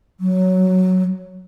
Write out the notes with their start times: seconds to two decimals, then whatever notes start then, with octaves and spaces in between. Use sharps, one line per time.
0.20 F#3